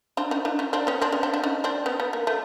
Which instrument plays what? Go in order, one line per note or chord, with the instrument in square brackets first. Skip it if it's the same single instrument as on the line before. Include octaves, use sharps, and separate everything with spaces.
[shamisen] C4 D4
C#4 D#4
D4 E4
C#4 D#4
C4 D4
B3 C#4
C4 D4
B3 C#4
C4 D4
C4 D4
C#4 D#4
C4 D4
B3 C#4
B3
A#3
A3